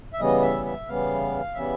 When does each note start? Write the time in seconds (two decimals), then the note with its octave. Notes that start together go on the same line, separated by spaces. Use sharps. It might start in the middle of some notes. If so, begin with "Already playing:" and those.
0.13 E5
0.19 C#3 E3 G3 B3 D#5
0.42 E5
0.65 E5
0.87 C#3 E3 G3 B3 F5
1.54 C#3 E3 G3 B3 E5